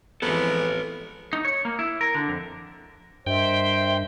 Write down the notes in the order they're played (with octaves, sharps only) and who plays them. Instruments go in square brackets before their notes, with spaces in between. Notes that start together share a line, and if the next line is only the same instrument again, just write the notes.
[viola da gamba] F2 E3 G#3 [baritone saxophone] B3 [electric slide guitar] A4 B4
[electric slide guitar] D#4
C#5
A#3
E4
A#4
D3
F2
[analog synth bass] G2 [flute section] A#4 D#5 E5 [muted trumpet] C5 [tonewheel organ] G5